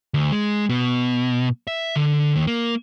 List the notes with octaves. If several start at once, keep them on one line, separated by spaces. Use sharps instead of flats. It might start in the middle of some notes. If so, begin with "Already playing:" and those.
D2
G#3
B2
E5
D3
D#2
A#3